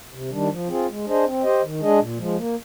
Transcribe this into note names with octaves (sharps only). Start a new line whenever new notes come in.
C3
D#3 G3 D4
F3
C4 F4 G#4
G#3
D4 G#4 C5 D#5
C4
G4 C5 D#5
D#3
G#3 D4 G#4 D#5
A#2
F3 G#3
A#3